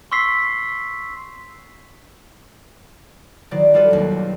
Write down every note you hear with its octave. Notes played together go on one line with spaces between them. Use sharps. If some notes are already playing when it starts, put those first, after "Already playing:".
C6 C#6 E6 B6 C7
D#3 F#3 E4 C5 D5
G3 F4 A4 B4
E1 D#2